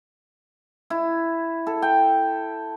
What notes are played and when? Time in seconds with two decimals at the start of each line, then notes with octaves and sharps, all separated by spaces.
0.90 E4
1.67 A4
1.82 G5